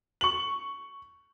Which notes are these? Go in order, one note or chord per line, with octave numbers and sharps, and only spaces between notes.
C#6 F#7